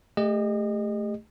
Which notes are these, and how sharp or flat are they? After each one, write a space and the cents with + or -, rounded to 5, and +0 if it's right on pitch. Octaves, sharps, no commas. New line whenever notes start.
A3 -5 G4 +40 D#5 -25